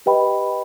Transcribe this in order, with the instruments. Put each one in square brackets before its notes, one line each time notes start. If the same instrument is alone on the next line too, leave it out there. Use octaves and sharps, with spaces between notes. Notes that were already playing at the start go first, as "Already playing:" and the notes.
[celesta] G4 B4 D#5 G5 B5